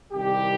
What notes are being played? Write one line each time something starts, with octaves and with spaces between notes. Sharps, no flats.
C2 C3 D#3 G3 G4